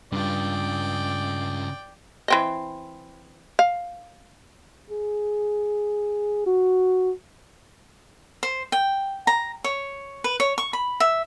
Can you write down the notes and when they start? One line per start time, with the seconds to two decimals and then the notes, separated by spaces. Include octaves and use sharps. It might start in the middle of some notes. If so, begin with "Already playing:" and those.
0.12 G2 C#3 F4 D5 G5
2.28 E3 C4 D#5
3.59 F5
4.90 G#4
6.46 F#4
8.43 C5
8.72 G5
9.27 A#5
9.64 C#5
10.24 B4
10.40 C#5
10.58 C#6
10.73 B5
11.00 E5